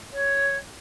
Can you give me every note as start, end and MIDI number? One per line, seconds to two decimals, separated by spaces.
0.13 0.57 73